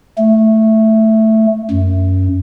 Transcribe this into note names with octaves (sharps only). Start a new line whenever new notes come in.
A3
F#2